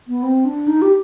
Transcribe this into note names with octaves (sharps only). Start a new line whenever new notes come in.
B3
C4
D4
D#4
G4